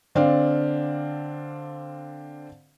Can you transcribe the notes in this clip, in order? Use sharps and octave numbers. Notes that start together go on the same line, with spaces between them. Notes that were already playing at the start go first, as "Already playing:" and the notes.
D3 C4 D4 D5 F5